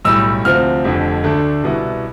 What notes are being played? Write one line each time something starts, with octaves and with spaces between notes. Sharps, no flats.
B1 A2 G3 E6
D2 C3 F3 C4 F6
F1 F2 D3
D2 D3 A3 D4
C2 B2 B3 E4